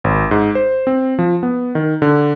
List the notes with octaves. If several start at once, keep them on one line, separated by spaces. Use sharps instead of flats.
G#1
G#2
C5
C4
F3
B3
D#3
D3